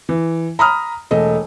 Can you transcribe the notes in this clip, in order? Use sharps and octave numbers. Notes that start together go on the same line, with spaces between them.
E3
A#5 B5 D#6 F6
E1 A3 D#5